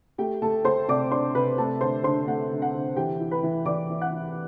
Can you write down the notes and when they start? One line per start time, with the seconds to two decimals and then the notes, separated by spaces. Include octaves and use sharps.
0.18 A3 G4 G5
0.42 A3 A4 A5
0.65 A3 C5 C6
0.88 C3 D5 D6
1.11 D4 C5 C6
1.34 C3 B4 B5
1.58 A3 A4 A5
1.81 D3 C5 C6
2.03 D3 C5 C6
2.28 A3 F#5
2.51 D3
2.62 F#5
2.74 D3
2.96 E3 G4 G5
3.20 E4
3.31 B4 B5
3.43 E3
3.66 E3 D5 D6
3.90 E3
4.01 F#5 F#6
4.12 E3